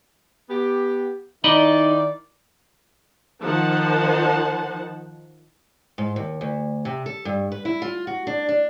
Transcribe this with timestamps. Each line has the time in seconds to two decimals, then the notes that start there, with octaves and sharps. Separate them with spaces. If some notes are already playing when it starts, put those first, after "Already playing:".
0.49 B3 G4
1.44 D#3 D#4 E4 D5 D#5 B5
3.43 D#3 F3 D#4 C5 F#5 A5
5.98 G#2
6.16 D#2
6.41 D2
6.85 C3
7.06 A4
7.25 G2
7.52 B4
7.65 E4
7.82 F4
8.07 F#4
8.27 D4
8.49 D4